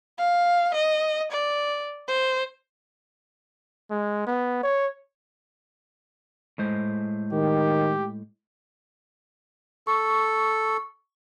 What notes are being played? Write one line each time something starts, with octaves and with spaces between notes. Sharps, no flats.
F5
D#5
D5
C5
G#3
B3
C#5
A2 G#3 C5
D#3 G4
A4 C#6